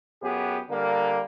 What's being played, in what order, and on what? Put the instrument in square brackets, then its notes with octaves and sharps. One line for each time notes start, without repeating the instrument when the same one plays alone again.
[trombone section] F#2 B3 G4 G#4
D3 G3 A#3